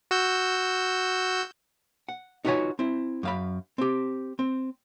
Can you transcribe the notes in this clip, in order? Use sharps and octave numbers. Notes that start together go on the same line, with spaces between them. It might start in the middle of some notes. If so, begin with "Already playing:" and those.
F#4 E6 G6
F#5
D#4 F4 F#4 B4 C#5 G#5
C4 E4
F#2 F5 B5
C4 G4
C4